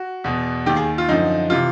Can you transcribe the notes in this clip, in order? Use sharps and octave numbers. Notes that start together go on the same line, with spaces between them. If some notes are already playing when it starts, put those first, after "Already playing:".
Already playing: F#4
E2 B2
D#2 D#3 G4
G#4
F4
F#2 D3 F3 D#4
C3 E3 F4